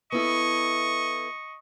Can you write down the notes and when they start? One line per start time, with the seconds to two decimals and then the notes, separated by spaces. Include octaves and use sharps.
0.12 B3 E4 A4 D#5 C#6